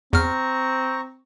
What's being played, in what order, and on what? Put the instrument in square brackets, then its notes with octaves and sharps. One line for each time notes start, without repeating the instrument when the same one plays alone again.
[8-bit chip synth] E2 F6 [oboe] C4 [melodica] A#5 C#6